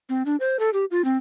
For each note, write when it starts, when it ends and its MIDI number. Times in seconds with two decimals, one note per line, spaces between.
0.09 0.23 60
0.26 0.36 62
0.40 0.57 72
0.59 0.70 69
0.73 0.85 67
0.91 1.04 65
1.05 1.17 60